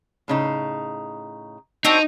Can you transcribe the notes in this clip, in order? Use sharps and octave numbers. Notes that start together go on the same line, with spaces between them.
A2 C#3 D#4
C4 D4 D#4 F#4